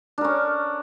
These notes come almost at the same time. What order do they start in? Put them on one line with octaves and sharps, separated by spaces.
D4 A#4 C#4